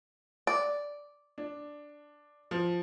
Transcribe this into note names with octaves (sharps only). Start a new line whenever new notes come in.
D5
D4
F3